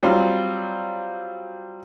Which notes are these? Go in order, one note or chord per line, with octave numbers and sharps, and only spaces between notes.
F#3 G3 C4 F4